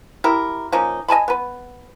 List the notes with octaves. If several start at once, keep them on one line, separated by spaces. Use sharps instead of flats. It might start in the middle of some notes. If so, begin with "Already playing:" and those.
E4 G4 A#4
F3 A#3 C#4 D#4
D#5 G#5 A5 B5
B3 B4